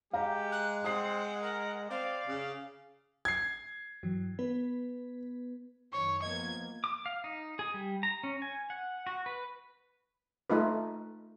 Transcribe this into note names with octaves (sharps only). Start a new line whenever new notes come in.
G#3 G4 F5 A#5
F#6
C4 F#5 D#6 C7
A#4 F#5
C4 D5 F5
C#3
G#6 C7
G2 E3 F#3
B3 B4
F#2 D#3 C#5 C#6
F3 A#3 B3 D#5 G#6
D6
F5
D#4
G#4
G3
A#5
C#4
G#5
F#5
F#4
B4
A3 D#4 F4 B4